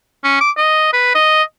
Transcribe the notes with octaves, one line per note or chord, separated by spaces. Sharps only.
C#4
D6
D#5
B4
D#5